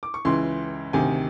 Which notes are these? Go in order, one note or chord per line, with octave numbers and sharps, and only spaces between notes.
D6
C#6
C#2 C#3 E3 C6
D2 C3 D#3 G#5